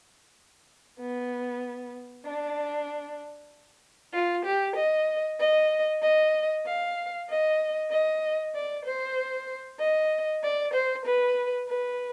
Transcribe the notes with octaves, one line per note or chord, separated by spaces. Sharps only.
B3
D4
F4
G4
D#5
D#5
D#5
F5
D#5
D#5
D5
C5
D#5
D5
C5
B4
B4